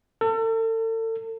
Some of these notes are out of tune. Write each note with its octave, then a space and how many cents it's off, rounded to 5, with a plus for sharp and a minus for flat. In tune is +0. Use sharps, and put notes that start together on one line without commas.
A4 +40